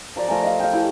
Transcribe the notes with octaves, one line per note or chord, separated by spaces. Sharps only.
F3 A#4 D5
F3 A3 G#5 A#5
D#5 F5
F5 G5
E4 G4